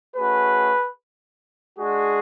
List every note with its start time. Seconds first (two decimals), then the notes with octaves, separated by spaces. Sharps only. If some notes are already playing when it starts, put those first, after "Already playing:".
0.15 A3 C#4 F#4 G#4 B4
1.78 G#3 D4 F#4 G#4